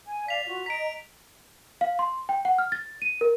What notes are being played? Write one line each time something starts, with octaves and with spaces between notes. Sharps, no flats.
G#5
D5 F5 B6 F7
F4 F#4
D#5 A#5 B6 D7
F5
C6
G5
F#5
F6
A6
D#7
A#4